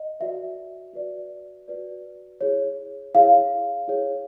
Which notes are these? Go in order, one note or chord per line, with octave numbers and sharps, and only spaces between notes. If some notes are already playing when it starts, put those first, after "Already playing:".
Already playing: D#5
F#4 B4 D5 E5
F#4 B4 D5
F#4 B4 D5
E4 G#4 C#5
E4 G#4 C#5 F5
E4 G#4 C#5